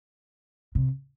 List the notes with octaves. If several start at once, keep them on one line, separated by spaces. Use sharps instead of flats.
C3